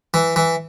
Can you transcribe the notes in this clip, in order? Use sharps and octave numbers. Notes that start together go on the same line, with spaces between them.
E3
E3